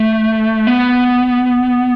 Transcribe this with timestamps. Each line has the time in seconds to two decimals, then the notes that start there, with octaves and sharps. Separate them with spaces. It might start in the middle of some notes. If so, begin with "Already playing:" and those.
Already playing: A3
0.67 B3